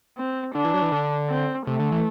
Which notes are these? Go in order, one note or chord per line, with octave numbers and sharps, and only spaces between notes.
C4
D3 D4
E3
F#3
E3
D3
C4
C3 A3
D3
E3